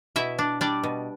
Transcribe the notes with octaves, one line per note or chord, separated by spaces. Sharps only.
B2 E4 E5
D4
G3 D4 D5
B2